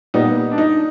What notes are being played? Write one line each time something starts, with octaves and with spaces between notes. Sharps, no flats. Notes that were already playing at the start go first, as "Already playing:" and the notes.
A#2 G3 B3 D#4
D4
D#4